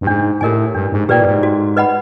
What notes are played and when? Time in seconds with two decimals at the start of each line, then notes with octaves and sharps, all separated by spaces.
0.01 G2
0.07 G#2 D4
0.41 A2 G4 A#4 D#5 G#5
0.75 G2 D4
0.92 G#2
1.09 A#2 G4 B4 D5 G5
1.20 A2
1.25 G#2
1.43 F#4
1.77 B4 D#5 F#5 B5